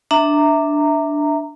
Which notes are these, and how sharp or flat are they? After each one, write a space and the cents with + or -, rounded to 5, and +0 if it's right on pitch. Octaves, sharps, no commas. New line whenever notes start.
D4 +0 E5 -10 A#5 -20